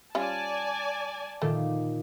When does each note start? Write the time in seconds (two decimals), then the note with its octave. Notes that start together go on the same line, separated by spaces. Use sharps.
0.15 G3 C#4 F4 D5 G#5 A5
1.42 A#2 D#3 A3